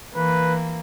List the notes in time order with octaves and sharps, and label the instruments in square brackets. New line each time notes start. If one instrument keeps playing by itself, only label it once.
[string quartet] E3 A#3 [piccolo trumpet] B4